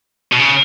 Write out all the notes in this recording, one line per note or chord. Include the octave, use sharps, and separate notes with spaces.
B2
C#3